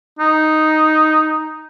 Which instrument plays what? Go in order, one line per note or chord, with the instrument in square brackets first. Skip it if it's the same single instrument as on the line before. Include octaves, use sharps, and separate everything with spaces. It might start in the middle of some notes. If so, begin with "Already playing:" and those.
[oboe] D#4